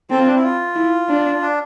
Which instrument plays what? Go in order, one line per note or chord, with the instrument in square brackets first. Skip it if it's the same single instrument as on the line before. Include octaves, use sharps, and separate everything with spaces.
[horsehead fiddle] C4 [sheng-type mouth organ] A4
[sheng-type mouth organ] F4
D4
E4
F4
[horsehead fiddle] E4
D4
[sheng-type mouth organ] D4